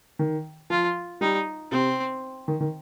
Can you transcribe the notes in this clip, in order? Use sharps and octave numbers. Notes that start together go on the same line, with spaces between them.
D#3
F3 F4
G3 D#4
C3 C4
D#3
D#3